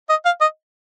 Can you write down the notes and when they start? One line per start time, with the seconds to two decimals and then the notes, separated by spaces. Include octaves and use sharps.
0.09 D#5
0.25 F5
0.41 D#5